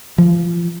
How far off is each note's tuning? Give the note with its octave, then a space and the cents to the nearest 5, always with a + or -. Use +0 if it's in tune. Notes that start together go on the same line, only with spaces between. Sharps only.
F3 -25